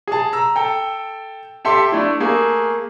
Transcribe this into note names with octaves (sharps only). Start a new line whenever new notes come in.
G#4 A5
A#5 E6
A4 G5
G4 A4 E5 C6 D6
A3 D4 E4
A3 A#3 G#4